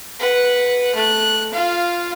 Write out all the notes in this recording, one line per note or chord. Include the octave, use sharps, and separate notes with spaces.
B4 F#5
A3 F#6
F4 F5